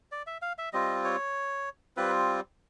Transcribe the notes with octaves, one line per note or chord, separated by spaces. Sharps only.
D5
E5
F5
E5
G3 C4 F4 D#5
C#5
G3 C4 F4 B4